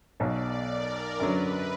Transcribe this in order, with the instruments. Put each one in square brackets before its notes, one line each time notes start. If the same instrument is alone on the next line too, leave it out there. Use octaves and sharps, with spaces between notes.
[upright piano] B1 B2 F#3 [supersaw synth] D5
[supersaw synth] A#4
[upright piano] F#2 D3 F#3 [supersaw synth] B4